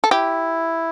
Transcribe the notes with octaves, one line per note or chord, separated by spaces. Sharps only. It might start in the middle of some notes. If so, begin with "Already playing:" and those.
A4
E4 G4